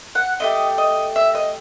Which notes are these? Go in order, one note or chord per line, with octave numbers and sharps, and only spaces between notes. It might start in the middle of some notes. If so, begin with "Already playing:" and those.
F#5
A3 E4 G4 D#5
D#5
E5
D#5